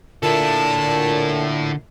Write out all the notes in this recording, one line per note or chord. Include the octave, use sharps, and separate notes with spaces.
A#2 D3 E4 A4 A5